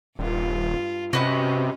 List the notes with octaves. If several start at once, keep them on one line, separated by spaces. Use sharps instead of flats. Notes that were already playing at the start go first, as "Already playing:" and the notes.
D#1 G2 F4
C3 C#4 F#4 B4 D#5